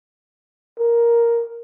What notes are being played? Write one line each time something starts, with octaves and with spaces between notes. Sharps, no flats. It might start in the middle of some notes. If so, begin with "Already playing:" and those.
A#4